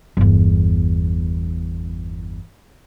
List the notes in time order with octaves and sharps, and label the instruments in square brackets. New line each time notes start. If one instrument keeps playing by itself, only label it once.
[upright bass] G1 E2